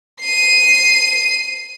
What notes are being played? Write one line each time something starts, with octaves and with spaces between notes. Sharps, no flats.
C7 D#7